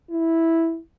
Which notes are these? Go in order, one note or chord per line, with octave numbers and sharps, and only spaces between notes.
E4